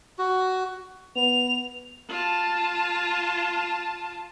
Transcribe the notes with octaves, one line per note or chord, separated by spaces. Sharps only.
F#4
B3 F7
F4 A5